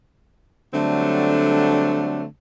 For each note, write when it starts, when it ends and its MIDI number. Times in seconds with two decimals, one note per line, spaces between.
0.74 2.25 50
0.74 2.25 54
0.74 2.25 55
0.74 2.25 57
0.74 2.25 60
0.74 2.25 62